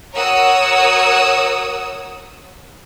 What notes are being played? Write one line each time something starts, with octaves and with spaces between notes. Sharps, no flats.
F#4 A#4 C#5 F#5 D#6 E6